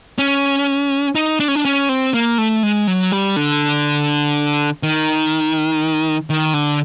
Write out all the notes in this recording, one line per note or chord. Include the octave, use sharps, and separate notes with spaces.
C#4
D#4
D4
C#4
D4
C#4
C4
A#3
A3
G#3
F#3
G3
D3
D#3
D#3
D3